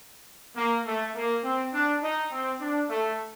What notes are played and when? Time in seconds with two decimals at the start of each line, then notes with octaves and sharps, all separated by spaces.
0.56 A#3
0.86 A3
1.15 A#3
1.44 C4
1.74 D4
2.03 D#4
2.32 C4
2.61 D4
2.90 A3